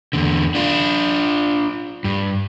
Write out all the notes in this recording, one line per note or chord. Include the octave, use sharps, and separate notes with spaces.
E2 D3
D4 F4
G2